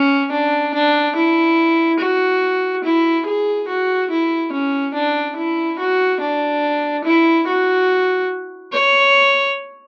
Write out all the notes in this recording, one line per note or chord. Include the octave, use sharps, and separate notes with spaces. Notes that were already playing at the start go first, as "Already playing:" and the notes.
Already playing: C#4
D4
D4
E4
F#4
E4
G#4
F#4
E4
C#4
D4
E4
F#4
D4
E4
F#4
C#5